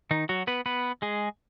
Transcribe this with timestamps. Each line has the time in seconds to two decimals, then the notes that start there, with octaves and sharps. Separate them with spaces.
0.11 D#3 D#4
0.29 F#3 F#4
0.47 B3 B4
0.66 B3 B4
1.02 G#3 G#4